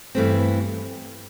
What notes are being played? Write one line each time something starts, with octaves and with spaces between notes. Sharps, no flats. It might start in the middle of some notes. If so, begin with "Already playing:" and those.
G2 E3 A3 C4